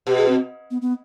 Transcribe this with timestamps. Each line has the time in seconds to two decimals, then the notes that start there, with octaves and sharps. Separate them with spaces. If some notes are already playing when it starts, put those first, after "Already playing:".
0.07 B2 G4
0.17 G#4
0.28 C4
0.71 B3
0.82 B3